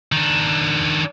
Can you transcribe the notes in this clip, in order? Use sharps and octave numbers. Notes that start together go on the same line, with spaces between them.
D#3 D4